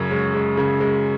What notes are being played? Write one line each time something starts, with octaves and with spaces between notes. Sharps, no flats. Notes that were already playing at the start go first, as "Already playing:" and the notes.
Already playing: F#2 C#3 C#5
G#3
G#3
C#3
G#3